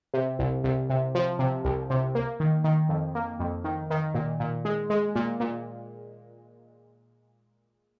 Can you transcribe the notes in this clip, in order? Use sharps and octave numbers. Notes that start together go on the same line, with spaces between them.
C3
C2
C2
C3
F3
C3
C2
C3
A#3
D#3
D#3
F2
A#3
F2
D#3
D#3
A#2
A#2
G#3
G#3
A#2
A#2